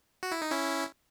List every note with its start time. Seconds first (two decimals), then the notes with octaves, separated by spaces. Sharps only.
0.23 F#4
0.32 E4
0.42 D#4
0.51 C#4 E4